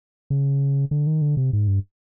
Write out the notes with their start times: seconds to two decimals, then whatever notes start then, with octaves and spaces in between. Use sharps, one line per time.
0.30 C#3
0.91 D3
1.07 D#3
1.21 D3
1.37 C3
1.53 G#2
1.68 G2